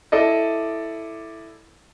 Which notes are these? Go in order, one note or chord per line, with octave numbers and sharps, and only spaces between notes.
E4 A4 D5 D#5